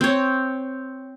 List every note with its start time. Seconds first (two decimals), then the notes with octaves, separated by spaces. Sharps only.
0.01 C4 C#5